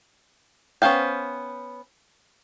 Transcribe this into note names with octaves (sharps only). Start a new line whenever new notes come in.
B3 C#4 C5 F5 G5